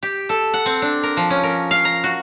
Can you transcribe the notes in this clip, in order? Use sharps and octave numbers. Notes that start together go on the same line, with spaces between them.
G4
A4
F#5
C4
D4
A#4
F3
C#4
A#4
F5
A#5
F#4